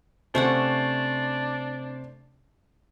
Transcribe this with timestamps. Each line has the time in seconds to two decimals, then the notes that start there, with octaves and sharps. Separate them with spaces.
0.35 C3 A3 C#4 D4 C5 F#5